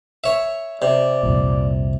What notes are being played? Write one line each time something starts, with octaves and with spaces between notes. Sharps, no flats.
C#5 E5
C3 D5
C2 F2 A#2